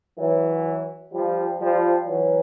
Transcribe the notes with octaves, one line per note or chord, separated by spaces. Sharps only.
E3 F#3
F3 G3
F3 G3
E3 F#3